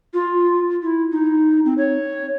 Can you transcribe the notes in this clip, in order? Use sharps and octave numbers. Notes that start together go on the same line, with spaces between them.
F4
E4
D#4
C4
C#5